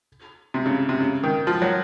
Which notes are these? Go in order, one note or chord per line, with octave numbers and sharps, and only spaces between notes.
C3
C#3
C3
C#3
D#3
F3
F#3